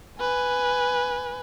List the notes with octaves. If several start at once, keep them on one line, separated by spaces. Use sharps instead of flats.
B4 G#5